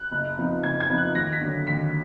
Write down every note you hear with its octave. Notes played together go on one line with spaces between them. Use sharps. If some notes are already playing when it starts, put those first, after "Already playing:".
Already playing: F#6
F#1
F2 F3 B3 D#4
F#1 G#6
G#6
F2 F3 B3 D#4
F#6
D#2 A#6
B6
D3 F#3
D#2 B6